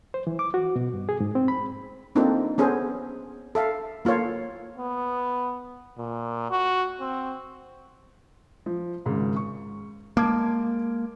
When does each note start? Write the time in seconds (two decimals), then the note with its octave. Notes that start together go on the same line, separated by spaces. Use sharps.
0.14 C5
0.27 E3
0.39 D6
0.54 F#4
0.76 B2
0.94 G2
1.09 G#4
1.20 G#2
1.35 C4
1.48 B5
2.15 A#3 C4 D4 D#4 F4 A4
2.58 B3 C#4 G#4 A4 C5
3.55 A4 E5 F5
4.05 A#3 F4 A4 C#5
4.77 B3
5.98 A#2
6.51 F#4
7.00 C4
8.66 F3
9.06 G#1 G#2 C#3
9.36 C#6
10.17 G#3 A#3 A5 D6 G#6